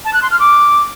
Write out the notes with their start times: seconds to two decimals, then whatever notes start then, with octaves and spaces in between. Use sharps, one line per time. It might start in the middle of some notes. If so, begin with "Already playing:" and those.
0.05 A5
0.14 F#6
0.22 C6
0.31 F6
0.40 D6